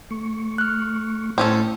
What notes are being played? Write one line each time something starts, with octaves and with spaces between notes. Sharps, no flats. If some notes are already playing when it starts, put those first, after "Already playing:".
A3 C#6
F6 F#6
A2 C4 C#4 A4